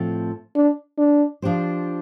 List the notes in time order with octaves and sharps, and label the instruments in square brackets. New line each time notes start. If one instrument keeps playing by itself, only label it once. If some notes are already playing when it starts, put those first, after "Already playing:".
Already playing: [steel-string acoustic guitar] A2 F3 C4 A4
[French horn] D4
D4
[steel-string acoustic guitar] F3 D4 G4 C5